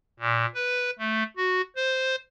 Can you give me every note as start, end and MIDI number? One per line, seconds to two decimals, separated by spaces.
0.19 0.46 46
0.55 0.90 71
0.99 1.23 57
1.37 1.61 66
1.76 2.15 72